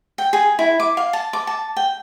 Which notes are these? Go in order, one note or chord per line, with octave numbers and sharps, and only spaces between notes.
G5
G#4
E4
D6
F5
A5
D6
A5
G5